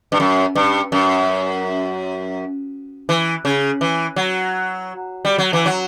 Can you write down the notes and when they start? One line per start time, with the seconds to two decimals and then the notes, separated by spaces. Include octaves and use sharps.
0.12 G2
0.20 F#2
0.55 G2
0.92 F#2
3.09 E3
3.45 C#3
3.81 E3
4.16 F#3
5.25 G3
5.38 F#3
5.53 E3
5.66 F#3